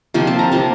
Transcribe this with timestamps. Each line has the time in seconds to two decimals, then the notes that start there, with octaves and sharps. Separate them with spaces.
0.14 C3 F3 A#3 G5
0.27 A5
0.39 A#5
0.52 C3 F3 A#3 A5